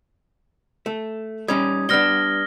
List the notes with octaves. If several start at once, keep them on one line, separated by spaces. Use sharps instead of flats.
A3
G3 C#4 D#4 D#6 G#6
G3 B3 D4 F6 A#6 G7